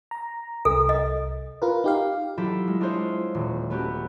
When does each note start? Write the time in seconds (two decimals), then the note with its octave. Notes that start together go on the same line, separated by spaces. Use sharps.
0.11 A#5
0.65 C2 A4
0.89 D#5
1.62 F4 A#4 B4
1.84 D#4 G4 F5
2.38 F#3 E4 F4 G4 A4 E5
2.68 G#3
2.80 D4 F4 G#4 C5 C#5 E5
3.34 D#1
3.70 A3 B3 C#4 F#4 G4